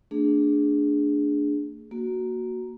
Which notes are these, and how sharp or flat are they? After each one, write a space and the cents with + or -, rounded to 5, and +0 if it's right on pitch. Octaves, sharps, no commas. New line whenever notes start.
A3 +40 D4 +0 G#4 +0
A#3 +0 F#4 +0